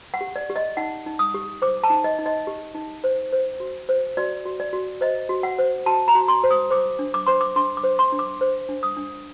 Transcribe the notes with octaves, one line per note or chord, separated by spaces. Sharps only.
F#5
G4
D5
G4
D#5
D#4 F#5
D#4
D#6
G4
C5 D6
A5
D#4
D#5
D#4
D#5
G4
D#4
C5
C5
F#4
C5
F#4 D5
F#4
D5
F#4
C5 D#5
F#4
F#5
C5
F#4 A5
A#5
F#4
C6
C5
D#6
C5 D6
D4
D6
C5 C6
D6
D4 C6
D6
C5
C6
D4
D6
C5
D4
D#6
D4